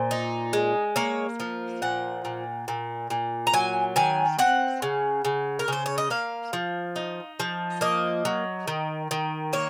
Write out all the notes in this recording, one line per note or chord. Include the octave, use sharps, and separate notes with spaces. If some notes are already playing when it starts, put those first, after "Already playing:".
Already playing: A#2 C5
D#4
G#3
A#3 C#5
F3
A#2 F#5
A#2
A#2
A#2
A#5
F#3 G#5
D#3 G#5
C4 F#5
C#3
C#3
A#4
C#3 C5
C#5
D#5
A#3 F5
F3
D#4
F3
A#3 D#5
F#3
D#3
D#3
A#3 C#5